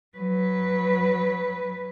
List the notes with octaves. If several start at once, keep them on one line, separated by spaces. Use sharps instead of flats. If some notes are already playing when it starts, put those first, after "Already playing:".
F#3 B4